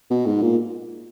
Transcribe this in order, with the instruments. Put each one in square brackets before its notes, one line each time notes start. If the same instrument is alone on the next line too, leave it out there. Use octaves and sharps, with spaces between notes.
[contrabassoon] B2
G#2
A#2